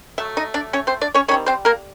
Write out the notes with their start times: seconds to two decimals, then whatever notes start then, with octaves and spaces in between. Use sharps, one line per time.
0.18 F#3 A3 E5
0.37 D#4 D#5
0.54 D4 D5
0.73 C#4 C#5
0.87 C4 C5
1.01 D4 D5
1.15 C#4 C#5
1.28 D#3 C#4 C#5
1.31 G3 C4
1.46 C4 C5
1.65 A#3 A#4